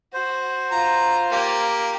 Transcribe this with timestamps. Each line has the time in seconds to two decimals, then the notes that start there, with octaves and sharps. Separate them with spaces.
0.14 F#4 C5
0.71 F4 A#5
1.32 A#3 G4